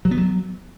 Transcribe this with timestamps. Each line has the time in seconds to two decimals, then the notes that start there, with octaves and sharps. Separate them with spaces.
0.05 F#3
0.11 B3
0.17 F#3